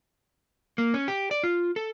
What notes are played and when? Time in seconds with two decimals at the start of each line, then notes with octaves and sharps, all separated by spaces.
0.78 A#3
0.94 C#4
1.08 G4
1.31 D5
1.44 F4
1.76 A4